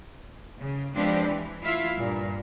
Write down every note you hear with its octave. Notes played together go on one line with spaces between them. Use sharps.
C#3
F3 G#3 C4 D4 G4 B4
E3
A3 E4 F4 E5 F5
G2 A#2